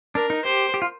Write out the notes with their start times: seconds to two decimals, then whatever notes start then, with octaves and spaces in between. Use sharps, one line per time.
0.15 D4 A#4
0.30 D#4
0.45 G4 C5
0.74 G4
0.82 F4